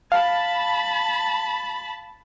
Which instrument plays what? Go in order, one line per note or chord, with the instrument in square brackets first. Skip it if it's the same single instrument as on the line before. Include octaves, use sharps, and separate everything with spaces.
[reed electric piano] F5 [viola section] A5 B5